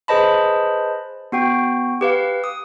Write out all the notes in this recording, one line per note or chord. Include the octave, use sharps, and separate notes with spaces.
G#4 B4 C5 D#5 A5 B5
B3 F#4 G5
G4 B4 F5
D#6